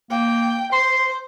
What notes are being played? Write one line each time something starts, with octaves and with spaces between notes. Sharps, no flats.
A#3 G5
C5 C6